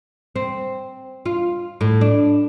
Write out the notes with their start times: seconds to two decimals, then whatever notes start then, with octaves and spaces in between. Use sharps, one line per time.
0.36 C4
1.26 F4
1.81 A2
2.01 D4